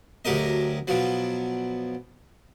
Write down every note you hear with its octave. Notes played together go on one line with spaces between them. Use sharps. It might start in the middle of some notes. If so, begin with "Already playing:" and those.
D2 F#3 G4 A#4 D#5
B2 F3 F#3